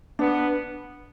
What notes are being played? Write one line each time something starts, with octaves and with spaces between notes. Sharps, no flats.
B3 D4